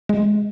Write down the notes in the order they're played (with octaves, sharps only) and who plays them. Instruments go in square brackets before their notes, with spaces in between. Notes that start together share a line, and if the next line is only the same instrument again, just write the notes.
[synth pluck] G#3